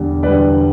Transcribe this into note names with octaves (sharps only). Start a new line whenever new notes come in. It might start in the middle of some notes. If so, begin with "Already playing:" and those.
Already playing: E1 E2 D3 G3
E1 E2 D3 G3 B4 D5